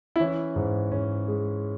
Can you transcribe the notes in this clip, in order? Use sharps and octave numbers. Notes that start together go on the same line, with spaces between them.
E4
E3 C#4
G#2
G#2 C#4
G#3